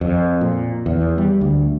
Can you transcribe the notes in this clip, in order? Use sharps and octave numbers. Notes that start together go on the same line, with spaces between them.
F2
A#2
E2
G3
D2